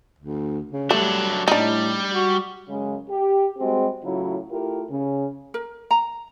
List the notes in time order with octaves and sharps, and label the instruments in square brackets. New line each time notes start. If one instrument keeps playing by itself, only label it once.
[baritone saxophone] D2
C#3
[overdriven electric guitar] F#3 D4 [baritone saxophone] G3 [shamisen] A3
[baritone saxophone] A2 [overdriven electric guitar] G3 [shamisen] D4 D#4
[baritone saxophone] F#4
[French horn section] F#2 C#3 G#3
G4
G3 G#3 C4 F#4 G#4
A2 C#3 F#3 E4 F4
A3 E4 F4 G4 A#4
C#3
[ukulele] A#4
A#5